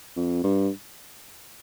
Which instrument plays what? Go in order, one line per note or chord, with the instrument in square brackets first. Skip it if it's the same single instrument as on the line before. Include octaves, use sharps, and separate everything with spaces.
[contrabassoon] F2
G2